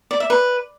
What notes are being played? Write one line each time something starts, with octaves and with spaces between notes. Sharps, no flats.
D5
E5
B4